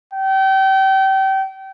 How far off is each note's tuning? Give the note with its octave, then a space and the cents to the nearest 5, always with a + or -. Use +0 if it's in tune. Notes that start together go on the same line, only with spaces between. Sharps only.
G5 -30